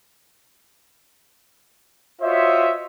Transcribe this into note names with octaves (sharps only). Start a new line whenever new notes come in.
F4 F#4 C5 C#5 D#5 E5